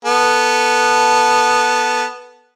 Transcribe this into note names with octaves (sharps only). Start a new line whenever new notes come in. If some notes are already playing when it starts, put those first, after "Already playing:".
B3 A4